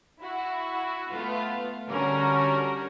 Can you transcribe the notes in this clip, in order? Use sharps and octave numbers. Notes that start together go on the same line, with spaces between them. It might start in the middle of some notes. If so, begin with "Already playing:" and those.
E4 F#4
A3 B3 F4
D3 G3 C#4 F#4 A#4